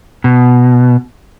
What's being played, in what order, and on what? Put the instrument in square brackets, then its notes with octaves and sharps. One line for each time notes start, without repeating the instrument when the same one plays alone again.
[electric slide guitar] B2